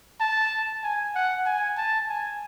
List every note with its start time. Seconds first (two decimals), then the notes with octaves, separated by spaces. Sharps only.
0.20 A5
0.83 G#5
1.15 F#5
1.46 G#5
1.77 A5
2.09 G#5